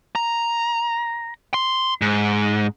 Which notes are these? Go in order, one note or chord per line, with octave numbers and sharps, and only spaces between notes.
A#5
C6
G#2